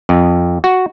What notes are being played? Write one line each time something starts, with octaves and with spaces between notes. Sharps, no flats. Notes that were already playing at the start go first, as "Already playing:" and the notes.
F2
F#4